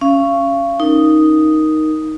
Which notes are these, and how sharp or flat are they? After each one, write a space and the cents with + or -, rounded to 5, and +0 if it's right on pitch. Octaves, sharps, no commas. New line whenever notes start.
C#4 +0 F5 -30
D#4 +0 A#4 +0